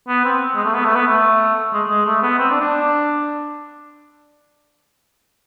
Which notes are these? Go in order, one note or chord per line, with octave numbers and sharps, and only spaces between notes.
B3
C4
G#3
A3
B3
A3
B3
A3
G#3
G#3
A3
B3
C4
D4
D4